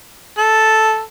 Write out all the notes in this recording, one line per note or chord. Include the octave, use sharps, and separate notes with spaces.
A4